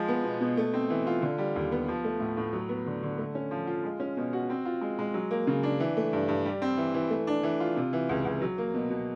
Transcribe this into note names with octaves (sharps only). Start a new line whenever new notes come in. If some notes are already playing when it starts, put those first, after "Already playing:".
Already playing: F3 G#3
B3
B2
B2
A3
C4
E3
F4
D3
G3
D#2
B3
F3
A3
A2
A2
F#3
B3
D3
D3
A3
C#4
F3
F4
G#3
C#4
B2
F#4
C4
F4
G#3
G#3
F#3
A#3
C#3
D4
E3
A3
G2
G2
G3
C4
E3
E3
A3
D4
E3
F4
C3
E3
C#2
C#2
F#3
A#3
B2
B2